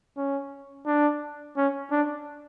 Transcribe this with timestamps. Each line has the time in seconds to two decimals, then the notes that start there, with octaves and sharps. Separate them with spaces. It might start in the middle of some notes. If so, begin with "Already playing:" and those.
0.17 C#4
0.86 D4
1.57 C#4
1.91 D4